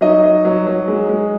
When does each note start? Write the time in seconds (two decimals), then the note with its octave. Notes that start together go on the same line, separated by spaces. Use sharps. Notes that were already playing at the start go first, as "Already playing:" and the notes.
0.01 F#3 D#4 D#5
0.24 F#3
0.45 F#3
0.67 F#3
0.88 G#3
1.09 G#3